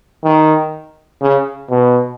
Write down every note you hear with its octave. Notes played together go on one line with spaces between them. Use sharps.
D#3
C#3
B2